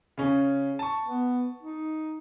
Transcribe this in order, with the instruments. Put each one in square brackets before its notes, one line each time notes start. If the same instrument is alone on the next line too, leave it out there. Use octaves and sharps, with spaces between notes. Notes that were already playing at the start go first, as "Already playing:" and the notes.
[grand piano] C#3 C#4
A5 C#6
[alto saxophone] B3
D#4